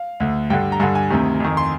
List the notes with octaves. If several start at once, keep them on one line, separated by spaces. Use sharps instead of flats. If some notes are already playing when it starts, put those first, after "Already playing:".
Already playing: F5
D2 D3
G2 D3 G5
A#5
G2 D3 G#5
G#5
D2 C3 D#3
F2 D#3
C6